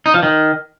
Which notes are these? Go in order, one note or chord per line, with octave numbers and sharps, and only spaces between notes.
D#4
F3
D#3